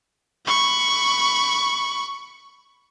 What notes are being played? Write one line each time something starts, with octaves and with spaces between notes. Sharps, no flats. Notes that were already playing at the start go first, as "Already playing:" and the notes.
B5 C#6